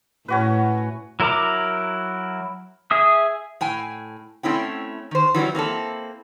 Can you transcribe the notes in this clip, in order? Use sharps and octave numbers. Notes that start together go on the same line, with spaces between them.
A2 C#4 F#4 B4
F#3 E4 A#4 A#5 D6
G#4 E5 D#6
A2 G5 G#5
A3 C4 C#4 E4 G5
D#3 C5
E3 F#3 G3 C#4
A#3 C4 E4 A4